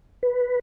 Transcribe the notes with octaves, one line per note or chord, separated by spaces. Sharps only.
B4